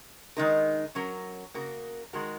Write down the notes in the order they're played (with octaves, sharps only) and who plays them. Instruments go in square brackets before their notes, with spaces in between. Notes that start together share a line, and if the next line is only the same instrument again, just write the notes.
[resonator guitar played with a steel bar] D#3 G#3 D#4 A#4
F#3 C#4 A#4
C#3 A#3 F#4 A#4
D#3 G#3 F#4 A#4